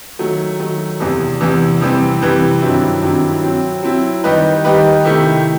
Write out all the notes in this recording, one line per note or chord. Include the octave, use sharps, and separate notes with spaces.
D#3 F#3 A3
D#3 F#3 A3
E2 C3 E3
E2 C3 E3
C3 E3 G3 C4
C3 E3 G3 C4
G2 D#3 F#3 C4 E4
G2 D#3 F#3 C4 E4
F#3 C4 E4
F#3 C4 E4
D#3 G3 D#4 G4 B4
D#3 G3 D#4 G4 B4
C3 D#3 A3 E4 G4